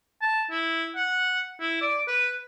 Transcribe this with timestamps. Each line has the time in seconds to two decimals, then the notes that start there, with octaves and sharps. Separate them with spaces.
0.22 A5
0.51 E4
0.96 F#5
1.60 E4
1.81 D5
2.08 B4